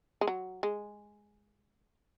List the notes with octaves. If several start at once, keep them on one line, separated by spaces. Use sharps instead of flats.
G#3
F#3
G#3